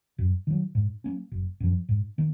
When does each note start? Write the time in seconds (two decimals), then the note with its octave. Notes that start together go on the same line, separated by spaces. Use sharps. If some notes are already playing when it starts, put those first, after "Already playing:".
0.18 F#2
0.47 D#3 F#3
0.75 G#2
1.04 F#3 A#3 C#4
1.32 F#1
1.60 F#2 F3
1.89 G#2
2.18 D#3 A#3